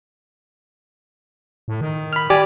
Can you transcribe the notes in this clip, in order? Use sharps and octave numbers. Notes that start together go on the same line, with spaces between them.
A2
D#3
B5 F6
G4 D5 G#5